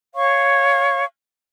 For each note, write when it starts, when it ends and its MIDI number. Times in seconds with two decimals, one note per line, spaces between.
0.15 1.05 73
0.15 1.05 77
0.15 1.05 85